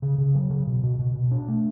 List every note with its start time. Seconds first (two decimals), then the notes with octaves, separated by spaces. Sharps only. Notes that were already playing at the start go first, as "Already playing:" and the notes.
0.02 C#3
0.18 C#3
0.35 F#3
0.50 C#3
0.67 B2
0.83 B2
0.99 B2
1.15 B2
1.31 D4
1.48 A3